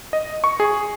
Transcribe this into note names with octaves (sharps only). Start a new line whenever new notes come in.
D#5
C#6
G#4